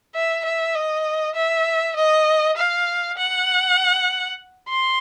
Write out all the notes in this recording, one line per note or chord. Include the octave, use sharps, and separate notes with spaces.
E5
E5
D#5
E5
D#5
F5
F#5
C6